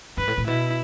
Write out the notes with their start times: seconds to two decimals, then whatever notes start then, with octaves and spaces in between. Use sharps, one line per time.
0.17 G2 B4
0.28 A2
0.38 A2
0.48 B2 E4